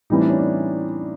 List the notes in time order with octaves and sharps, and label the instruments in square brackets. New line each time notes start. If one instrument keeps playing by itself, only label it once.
[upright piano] A2 E3 G3 C4 E4 [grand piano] D#4
[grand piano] D4
C#4
D4